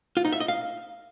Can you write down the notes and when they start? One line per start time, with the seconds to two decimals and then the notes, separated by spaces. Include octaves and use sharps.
0.17 F4
0.25 D#4
0.33 E5
0.40 D#5
0.48 F5